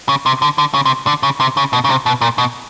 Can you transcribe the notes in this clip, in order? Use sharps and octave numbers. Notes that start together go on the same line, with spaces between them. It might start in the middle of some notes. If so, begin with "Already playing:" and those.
C#3
C3
D3
D3
C#3
C3
D3
C#3
C3
C#3
B2
C#3
C3
B2
A#2
B2